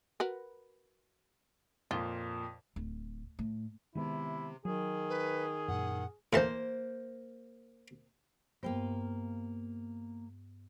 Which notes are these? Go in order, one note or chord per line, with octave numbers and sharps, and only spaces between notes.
F#4 A#4 B4
F2 A#2 F4
D1
A2
C3 D#3 G#3 B3 E4
D#3 F#3 G#4
B4
F#2 A#2 F#5
A2 E3 A#3 C5 A5
G2 A#3 B3 F4 C5 G5